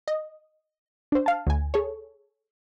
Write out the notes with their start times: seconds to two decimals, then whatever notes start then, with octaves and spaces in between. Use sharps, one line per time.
0.08 D#5
1.12 D4 C5
1.26 F5 A5
1.47 D2 G#5
1.74 G#4 A4 C#5